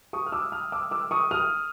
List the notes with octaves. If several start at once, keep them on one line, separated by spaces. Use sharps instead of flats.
C#6 D#6
F6
D6 E6
D#6 F6
D6 E6
D6 E6
C#6 D#6
D#6 F6